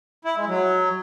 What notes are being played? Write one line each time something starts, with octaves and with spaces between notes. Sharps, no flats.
E4
G#3
F#3